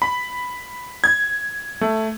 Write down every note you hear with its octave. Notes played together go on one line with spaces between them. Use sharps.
B5
G#6
A3